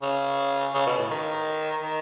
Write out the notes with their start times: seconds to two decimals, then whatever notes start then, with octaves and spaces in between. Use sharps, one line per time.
0.02 C#3
0.74 C#3
0.86 B2
0.98 A2
1.11 D#3
1.83 D#3